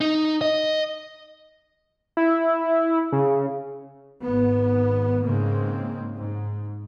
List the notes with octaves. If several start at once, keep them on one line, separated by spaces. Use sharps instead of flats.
D#4
D#5
E4
C#3
G#1 B3
G#2 C#3 G#3 A#3 C4
G#2